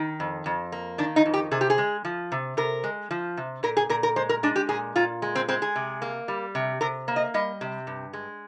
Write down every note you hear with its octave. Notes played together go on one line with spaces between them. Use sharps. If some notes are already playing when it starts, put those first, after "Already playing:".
Already playing: D#3
F2
F2
A#3
D#3 D4
D#4
F2
G4
C3 G#4
G4
G#4
G#3
F3
C3
C3 A#4
G#3
F3
C3
A#2 A#4
G#4
A#2 A#4
A#4
G#3 C5
A#4
G#3 D4
G4
A#2 G#4
A#2 F4
G#3
C4
G#3 C4
G#4
C3
A#3
G3
C3
C3 A#4
A#3
D#5
G3 D#5
C3
G2
G#3